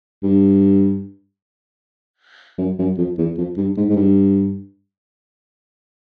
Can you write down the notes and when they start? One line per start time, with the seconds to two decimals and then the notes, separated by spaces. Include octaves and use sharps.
0.23 G2
2.58 F#2
2.79 F#2
2.98 F2
3.18 E2
3.38 F2
3.57 G2
3.77 G#2
3.89 G#2
3.96 G2